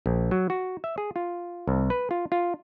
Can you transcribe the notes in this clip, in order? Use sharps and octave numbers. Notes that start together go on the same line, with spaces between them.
A#1
F#3
F#4
E5
G#4
F4
C2
B4
F4
F4